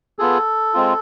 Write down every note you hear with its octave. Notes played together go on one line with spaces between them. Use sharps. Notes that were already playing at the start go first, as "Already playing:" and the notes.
B3 F4 G#4 A4
G#3 C4 F4